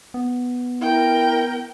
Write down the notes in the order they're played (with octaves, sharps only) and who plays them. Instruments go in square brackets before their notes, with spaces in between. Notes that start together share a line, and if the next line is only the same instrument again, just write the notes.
[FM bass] B3
[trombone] E4 [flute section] A#4 [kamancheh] G5